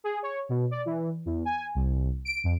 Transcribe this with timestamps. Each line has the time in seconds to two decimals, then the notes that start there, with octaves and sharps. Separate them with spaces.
0.04 G#4
0.23 C#5
0.49 B2
0.71 D5
0.85 E3
1.25 E2
1.45 G#5
1.75 C2
2.25 D7
2.44 F2